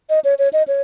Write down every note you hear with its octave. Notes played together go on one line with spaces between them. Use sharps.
D#5
C#5
C#5
D#5
C#5